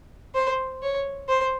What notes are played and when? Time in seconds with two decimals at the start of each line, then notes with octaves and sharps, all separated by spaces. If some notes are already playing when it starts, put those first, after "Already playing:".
0.35 C5
0.82 C#5
1.29 C5